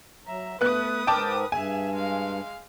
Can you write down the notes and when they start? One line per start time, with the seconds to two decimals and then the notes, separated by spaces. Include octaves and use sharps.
0.27 F#3 E5 A#5
0.61 A3 B3 B4 D#6 F#6
1.07 G#2 A#4 G5 A5 D6
1.52 G2 G#4 E5 G#5
1.93 G#3 F5